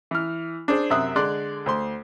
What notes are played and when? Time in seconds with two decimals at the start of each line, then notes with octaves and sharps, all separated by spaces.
0.11 E3 F6
0.68 D4 G#4 C5
0.90 F#2 C3 E5 D#6 F#6
1.16 D3 G#3 D5 C6 F#6
1.66 D2 C5 C6